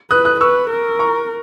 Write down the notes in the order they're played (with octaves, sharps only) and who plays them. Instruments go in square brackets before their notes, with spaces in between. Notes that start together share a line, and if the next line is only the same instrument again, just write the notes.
[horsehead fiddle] B4 [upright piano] D#6 F#6
[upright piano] D#6 F#6
[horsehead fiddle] B4 [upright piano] C#6 E6
[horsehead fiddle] A#4
[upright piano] A#5 C#6